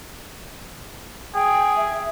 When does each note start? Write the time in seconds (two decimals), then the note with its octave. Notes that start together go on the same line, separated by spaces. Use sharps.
1.35 G#4 G5
1.77 E5